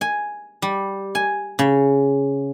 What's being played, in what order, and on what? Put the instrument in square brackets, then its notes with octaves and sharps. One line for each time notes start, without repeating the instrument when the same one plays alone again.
[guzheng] G#5
G3
G#5
C#3